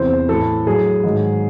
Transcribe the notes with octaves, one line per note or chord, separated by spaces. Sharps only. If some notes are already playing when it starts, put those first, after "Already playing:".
Already playing: E2 C3 E3 C5
A2 E3 A4
A2 F#3 G#4
G#2 D#3 F#3